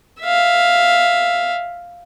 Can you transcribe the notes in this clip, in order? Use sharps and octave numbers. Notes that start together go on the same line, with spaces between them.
E5 F5